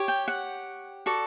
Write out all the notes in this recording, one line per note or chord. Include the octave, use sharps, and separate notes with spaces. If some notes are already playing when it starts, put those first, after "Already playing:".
Already playing: G4 C#5
G5
F#5
F#4 A4 D5